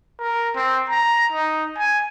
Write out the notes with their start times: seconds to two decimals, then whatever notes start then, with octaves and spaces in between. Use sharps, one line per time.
0.20 A#4
0.56 C4
0.89 A#5
1.32 D#4
1.78 G#5